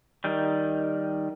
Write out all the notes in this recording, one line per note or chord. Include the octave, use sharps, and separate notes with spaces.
D#3 G3